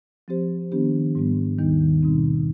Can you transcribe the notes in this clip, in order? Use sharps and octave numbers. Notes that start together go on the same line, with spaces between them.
F3 C4 G4 C5
D#3 B3 D4 G4
G#2 G3 B3
D#2 D#3 G3 B3 D#4
B2 G3 C4 D#4